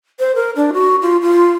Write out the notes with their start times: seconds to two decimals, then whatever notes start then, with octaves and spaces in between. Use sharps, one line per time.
0.19 C5
0.35 A#4
0.56 D4
0.73 F#4
1.02 F4
1.22 F4